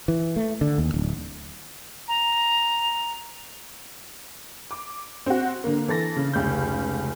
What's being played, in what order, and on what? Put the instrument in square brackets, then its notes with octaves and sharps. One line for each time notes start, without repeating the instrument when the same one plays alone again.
[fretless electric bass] E3
A3
D3
D#2
D1
[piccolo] A#5
[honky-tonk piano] D6
C4 F#4
D3 A#3
E3 A4 A6 A#6
C#3
F1 C#2 G6